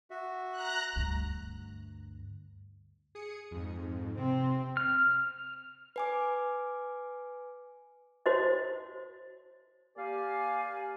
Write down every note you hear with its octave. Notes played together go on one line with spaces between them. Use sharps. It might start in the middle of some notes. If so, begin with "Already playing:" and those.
F#4 E5
A#5 F#6
D2 G2
G#4 D#6 C#7
F2 G#2
C3 C4
F6
B4 G#5 D6
F#4 C5 C#5 D#5
A#3 G4 A#4 D5 F5 G#5